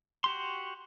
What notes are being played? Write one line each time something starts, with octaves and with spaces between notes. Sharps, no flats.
F#4 G4 C6